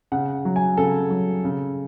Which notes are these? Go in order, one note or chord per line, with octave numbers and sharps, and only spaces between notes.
C#3 F#5
F#3
G#5
C#3 A4
F#3
C#3